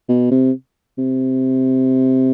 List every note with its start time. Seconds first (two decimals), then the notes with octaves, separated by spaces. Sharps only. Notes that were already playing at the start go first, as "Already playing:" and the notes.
0.09 B2
0.31 C3
0.98 C3